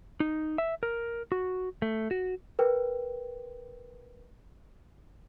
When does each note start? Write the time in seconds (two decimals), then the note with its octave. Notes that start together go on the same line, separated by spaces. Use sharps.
0.20 D#4
0.58 E5
0.83 A#4
1.32 F#4
1.82 A3
2.11 F#4
2.59 A#4 B4 G5